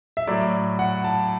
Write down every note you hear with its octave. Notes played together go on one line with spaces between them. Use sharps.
E5
A2 F#3 A3 D5
F#5
A5